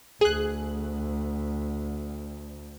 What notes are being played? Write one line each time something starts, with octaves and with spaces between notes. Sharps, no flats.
D2 G#4 F#6